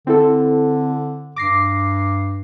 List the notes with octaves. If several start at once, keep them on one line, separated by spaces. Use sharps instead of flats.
D3 C4 E4 A4
G2 D6 A#6 C7